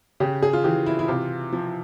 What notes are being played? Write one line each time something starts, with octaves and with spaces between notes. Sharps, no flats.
C#3 G4
G#4
F4
E3 G4
E4
E4
C3 F4
F3